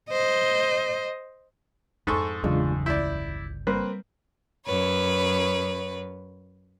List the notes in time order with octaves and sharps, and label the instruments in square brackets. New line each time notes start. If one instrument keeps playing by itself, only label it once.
[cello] C5 D#5
[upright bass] F2 D4 [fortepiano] G#2 A4 C#6
[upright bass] G1 C#3 [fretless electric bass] E2 E3 F#3 [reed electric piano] G#3 D4 F4
[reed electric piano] C#2 G6 [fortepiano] E4 D5
[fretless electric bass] G3 [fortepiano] A#3 C4 B4
[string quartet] F#2 B4 C#5